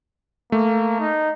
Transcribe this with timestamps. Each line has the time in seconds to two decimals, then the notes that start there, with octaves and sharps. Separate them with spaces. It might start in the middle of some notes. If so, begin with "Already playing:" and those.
0.52 A3 A#3
1.00 D#4